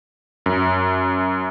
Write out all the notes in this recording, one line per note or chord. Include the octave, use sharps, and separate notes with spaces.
F#2